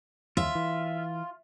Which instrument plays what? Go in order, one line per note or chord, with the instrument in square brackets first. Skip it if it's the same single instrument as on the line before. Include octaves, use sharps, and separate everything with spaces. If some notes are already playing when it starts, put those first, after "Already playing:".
[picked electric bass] D#2 [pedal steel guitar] F4 [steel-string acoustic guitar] E5
[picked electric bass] E3